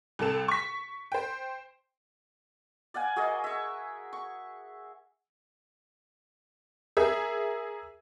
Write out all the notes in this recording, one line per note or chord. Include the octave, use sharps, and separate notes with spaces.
C2 C3 A4 E7
C#6 B6
C5 G5
D5 F5 F#5 G#5
F#4 G#4 A#4 D#5
E5 C#6
C#6
G#4 A#4 E5